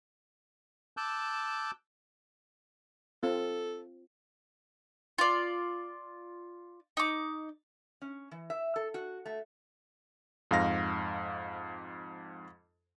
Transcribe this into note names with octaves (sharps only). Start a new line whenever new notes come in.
A5 D6 E6 F#6 G6
C4 F4 A4
F4 D5
D#4 D6
C#4
E3
E5
A4
F#4
A3
F2 G#2 F5 A#6